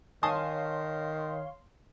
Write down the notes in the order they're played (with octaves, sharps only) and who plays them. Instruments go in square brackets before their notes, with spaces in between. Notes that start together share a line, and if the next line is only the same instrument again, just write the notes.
[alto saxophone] D#3 [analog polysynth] C#5 F5 C6 [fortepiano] G#5 A5 D#6